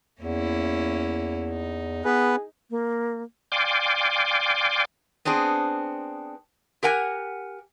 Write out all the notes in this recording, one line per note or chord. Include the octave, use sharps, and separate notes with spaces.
E2 A#3 C#4 E4
D#4
B3 G#4 B4
A#3
D5 F5 G5 G#5 C6 D6
B3 C4 D4 G#4
G4 A#4 F#5 G#5